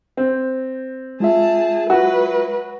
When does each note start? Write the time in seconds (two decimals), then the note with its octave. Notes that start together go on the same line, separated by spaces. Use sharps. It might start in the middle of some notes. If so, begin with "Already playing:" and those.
0.17 C4
1.20 G#3 F4 G#4 E5 A5
1.90 F#3 F#4 B4